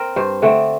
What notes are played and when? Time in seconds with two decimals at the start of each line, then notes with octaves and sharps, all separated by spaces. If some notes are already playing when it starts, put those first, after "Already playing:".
Already playing: C4 A#4
0.16 G2 C5
0.42 D3 A3 C4